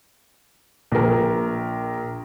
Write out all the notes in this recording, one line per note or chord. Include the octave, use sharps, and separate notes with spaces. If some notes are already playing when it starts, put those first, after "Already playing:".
A#1 A#4